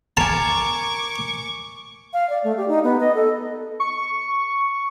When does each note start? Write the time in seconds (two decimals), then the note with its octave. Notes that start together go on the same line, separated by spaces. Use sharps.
0.17 A#4 G#5 A5 C#6 D6
2.13 F5
2.30 D5
2.44 A3
2.57 G4
2.68 D#4
2.84 B3
3.00 D#5
3.15 A4
3.80 C#6